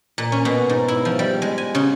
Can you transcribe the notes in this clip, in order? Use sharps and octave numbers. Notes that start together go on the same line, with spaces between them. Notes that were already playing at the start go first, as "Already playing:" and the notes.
A#2
C#4
B2
G#2
E4
F3
G3
G#3
G#5
C#3